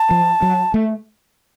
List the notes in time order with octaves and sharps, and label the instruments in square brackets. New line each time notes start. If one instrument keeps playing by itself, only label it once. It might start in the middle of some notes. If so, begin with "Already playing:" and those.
Already playing: [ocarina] A5
[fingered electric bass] F3
F#3
A3